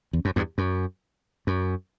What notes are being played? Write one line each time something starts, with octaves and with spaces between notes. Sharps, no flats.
E2
F#2
E2 G2
F#2
F#2